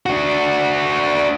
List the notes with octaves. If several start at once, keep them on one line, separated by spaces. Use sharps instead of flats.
D4 F#4